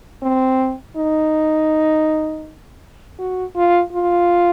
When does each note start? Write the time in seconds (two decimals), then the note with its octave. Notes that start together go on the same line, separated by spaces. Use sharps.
0.22 C4
0.96 D#4
3.19 F#4
3.55 F4
3.93 F4